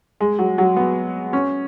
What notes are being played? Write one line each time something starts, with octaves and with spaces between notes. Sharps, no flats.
G#3
F#3
F#3
B3
C#4